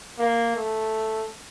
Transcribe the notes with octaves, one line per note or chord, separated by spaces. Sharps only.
A#3
A3